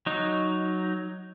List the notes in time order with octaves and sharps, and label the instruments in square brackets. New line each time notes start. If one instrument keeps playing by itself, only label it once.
[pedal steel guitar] F#3 D#4